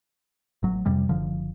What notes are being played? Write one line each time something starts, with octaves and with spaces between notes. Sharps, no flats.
A1 F#3
F2 C3 G3
F#1 D3 F3